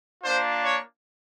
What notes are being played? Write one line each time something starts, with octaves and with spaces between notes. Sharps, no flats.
A#3 D4 F4 C5
C#5